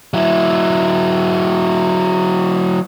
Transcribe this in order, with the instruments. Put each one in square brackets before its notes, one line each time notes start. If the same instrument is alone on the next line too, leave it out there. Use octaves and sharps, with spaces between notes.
[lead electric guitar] F#3 E4